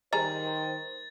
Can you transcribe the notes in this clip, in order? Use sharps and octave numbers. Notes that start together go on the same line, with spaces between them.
D#3 G3 G#4 C5 A#5 A6